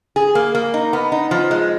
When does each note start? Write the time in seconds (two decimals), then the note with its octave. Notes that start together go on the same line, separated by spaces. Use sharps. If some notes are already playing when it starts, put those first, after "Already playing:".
0.16 G#4
0.35 A#3
0.55 A#3
0.74 D#4
0.93 B3
1.12 D#4
1.31 F3
1.51 G#3